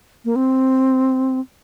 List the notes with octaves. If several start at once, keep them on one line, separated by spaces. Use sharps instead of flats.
A#3
C4